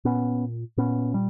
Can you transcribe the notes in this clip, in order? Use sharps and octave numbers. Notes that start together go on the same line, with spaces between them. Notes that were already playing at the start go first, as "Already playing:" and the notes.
A#2 B3 C#4
A#2 B3 C#4
G3